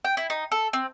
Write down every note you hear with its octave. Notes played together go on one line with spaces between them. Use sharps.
G5
E4
D#4
A4
C4